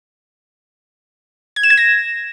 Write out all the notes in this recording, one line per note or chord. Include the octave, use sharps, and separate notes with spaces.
G#6
E7
G#6
A#6